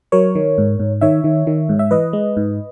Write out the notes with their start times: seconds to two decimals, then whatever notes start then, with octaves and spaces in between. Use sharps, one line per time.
0.12 F#3 A#4 C#5
0.35 D#3
0.58 G#2
0.79 G#2
1.01 D#3 C#5 E5
1.24 D#3
1.47 D#3
1.69 G#2
1.79 E5
1.91 E3 B4 D#5
2.13 G#3
2.37 G#2